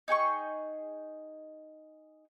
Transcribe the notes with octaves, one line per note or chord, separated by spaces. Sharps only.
D#4 G#4 G5 C#6